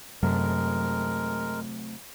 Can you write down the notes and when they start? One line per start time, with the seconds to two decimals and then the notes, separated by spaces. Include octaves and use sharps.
0.23 F#2 C3 F#3 G#3 A3 A#4